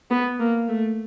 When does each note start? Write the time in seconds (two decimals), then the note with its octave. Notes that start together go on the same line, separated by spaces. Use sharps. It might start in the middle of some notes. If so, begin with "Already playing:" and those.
0.11 B3
0.39 A#3
0.68 A3